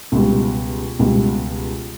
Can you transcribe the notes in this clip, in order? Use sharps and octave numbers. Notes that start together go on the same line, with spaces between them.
C#2 B2 G3
C#2 B2 G3